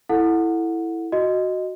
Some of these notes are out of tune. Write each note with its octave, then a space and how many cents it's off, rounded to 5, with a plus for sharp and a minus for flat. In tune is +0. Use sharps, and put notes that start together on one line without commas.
E4 +0 A4 +0 F#5 -20
F#4 +0 D#5 +0